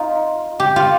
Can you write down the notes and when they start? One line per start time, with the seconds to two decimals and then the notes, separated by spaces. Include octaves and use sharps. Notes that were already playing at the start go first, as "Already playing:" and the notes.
Already playing: D#4 F4
0.60 G4
0.76 F4